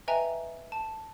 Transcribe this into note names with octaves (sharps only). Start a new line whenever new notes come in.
B4 D#5 E5 G5 G#5 A#5
A5